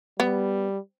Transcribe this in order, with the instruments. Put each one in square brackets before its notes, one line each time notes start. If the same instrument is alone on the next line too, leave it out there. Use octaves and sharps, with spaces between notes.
[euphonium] G3 [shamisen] B3